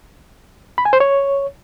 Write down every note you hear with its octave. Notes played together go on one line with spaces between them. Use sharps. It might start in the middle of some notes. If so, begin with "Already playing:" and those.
B5
G#5
C5
C#5